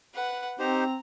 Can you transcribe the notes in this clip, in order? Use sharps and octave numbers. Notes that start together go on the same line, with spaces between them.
B4 F#5
C4 D#4 G4 C5 A#5